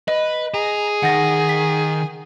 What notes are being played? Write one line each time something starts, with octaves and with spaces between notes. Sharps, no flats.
B4 D#5
G#4 A#5
D#3 F#5 A#6
B6